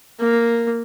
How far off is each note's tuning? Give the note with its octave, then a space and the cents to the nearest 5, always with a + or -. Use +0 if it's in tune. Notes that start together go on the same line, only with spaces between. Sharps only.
A#3 -5